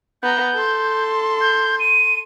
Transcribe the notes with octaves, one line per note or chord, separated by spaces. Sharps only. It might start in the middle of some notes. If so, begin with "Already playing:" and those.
B3 A#5 G6
A4 C6
G6
D#7